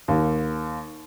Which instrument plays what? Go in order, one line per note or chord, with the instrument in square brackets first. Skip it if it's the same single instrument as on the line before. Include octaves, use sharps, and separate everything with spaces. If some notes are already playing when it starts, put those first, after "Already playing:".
[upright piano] D#2